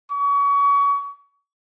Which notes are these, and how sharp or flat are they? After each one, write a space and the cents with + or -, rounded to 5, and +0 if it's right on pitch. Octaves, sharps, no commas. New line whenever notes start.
C#6 +30